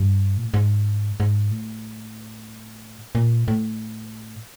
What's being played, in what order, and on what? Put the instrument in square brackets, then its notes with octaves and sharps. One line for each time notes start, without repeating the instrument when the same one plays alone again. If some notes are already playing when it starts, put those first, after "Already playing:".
Already playing: [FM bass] G2
A#2
A2
G#2
G#2
A2
A#2
A2